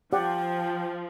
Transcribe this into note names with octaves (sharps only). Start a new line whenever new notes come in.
F3 G4 D5 F#5 G5